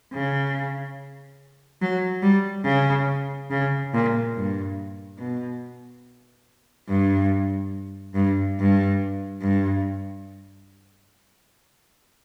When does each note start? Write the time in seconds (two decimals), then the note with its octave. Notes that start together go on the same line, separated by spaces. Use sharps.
0.12 C#3
1.81 F#3
2.23 G3
2.65 C#3
3.50 C#3
3.93 A#2
4.35 G2
5.19 B2
6.88 G2
8.15 G2
8.57 G2
9.41 G2